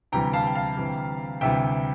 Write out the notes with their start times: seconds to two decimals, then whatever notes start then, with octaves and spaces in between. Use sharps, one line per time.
0.12 D2 C3 E3 G3 G5 A#5
0.33 F5 A5
0.47 G5
0.55 F5 A5
0.77 D2 C3 E3 G3
1.41 D2 C3 E3 G3 E5 G5